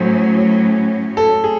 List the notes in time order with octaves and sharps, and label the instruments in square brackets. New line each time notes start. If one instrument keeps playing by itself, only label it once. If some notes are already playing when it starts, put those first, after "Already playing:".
Already playing: [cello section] A2 F#3 C#4 [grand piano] C5
[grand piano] A4
G#4